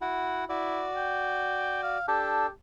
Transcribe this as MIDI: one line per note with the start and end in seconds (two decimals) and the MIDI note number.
0.01 0.45 64
0.01 0.45 66
0.01 0.45 78
0.49 0.86 64
0.49 1.98 66
0.49 1.98 74
0.96 1.82 79
1.83 2.05 77
2.08 2.47 62
2.08 2.50 67
2.08 2.47 69